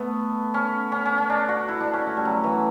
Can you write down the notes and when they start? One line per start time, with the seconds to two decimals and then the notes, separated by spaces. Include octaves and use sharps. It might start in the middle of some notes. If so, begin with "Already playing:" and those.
Already playing: A3 B3
0.54 C#4
0.92 C#4
1.05 C#4
1.18 C#4
1.30 D4
1.49 F#4
1.68 E4
1.80 D4
1.93 C#4
2.07 A3
2.17 G3
2.25 F#3
2.44 E3